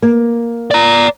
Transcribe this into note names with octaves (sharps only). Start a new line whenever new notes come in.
A#3
D5 A#5